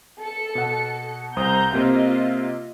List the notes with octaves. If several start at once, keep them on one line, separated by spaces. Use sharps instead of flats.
A4 C#7
B2 F#5
C2 C5 A#5 D#6 G6
C3 A#3 C4 F4 D#5